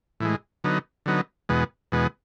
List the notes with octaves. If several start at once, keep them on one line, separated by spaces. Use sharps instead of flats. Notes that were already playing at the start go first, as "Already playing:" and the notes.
A2 E3 G#3
D3 F#3 B3 D#4
D3 F#3 B3 D#4
E2 B2 G#3 B3
E2 B2 G#3 B3